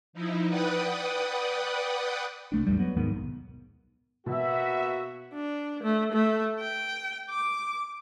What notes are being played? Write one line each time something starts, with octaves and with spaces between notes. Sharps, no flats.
F3 D#4 E4
B4 D5 F#5 G5 D#6
C2 A3 D4
A1 E2 G2 G3
F#3 B3
D#2 G#2 D#3 B3
B1
B2 A#3 B3 F#4 E5
D4
A3
A3
G5
D6